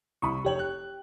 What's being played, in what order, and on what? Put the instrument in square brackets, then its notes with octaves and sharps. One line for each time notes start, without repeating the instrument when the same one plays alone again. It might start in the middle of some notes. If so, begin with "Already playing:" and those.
[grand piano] C2 E4 B5 [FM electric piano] C#6 D#6
[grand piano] F1 C#5 F#7 [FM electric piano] G4 G5
[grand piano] F#6